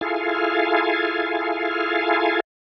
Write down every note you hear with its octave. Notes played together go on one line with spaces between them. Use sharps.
E4 F4 G#4 A4 F5 G#5